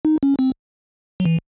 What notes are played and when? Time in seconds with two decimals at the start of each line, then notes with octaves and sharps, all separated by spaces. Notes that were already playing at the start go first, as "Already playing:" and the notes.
0.05 D#4
0.23 C#4
0.39 C4
1.20 F#3
1.25 E3